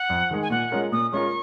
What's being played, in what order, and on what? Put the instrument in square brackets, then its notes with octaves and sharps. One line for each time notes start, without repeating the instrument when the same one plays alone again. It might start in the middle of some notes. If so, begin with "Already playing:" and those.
Already playing: [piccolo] F#5
[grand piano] F2
D#3 G#3
[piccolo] G#5
[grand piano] A#2 [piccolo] F#5
[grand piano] G#3 C#4 F4 A#4
[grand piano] A#2 [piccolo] D#6
[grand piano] G#3 C#4 F4 A#4 [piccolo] C#6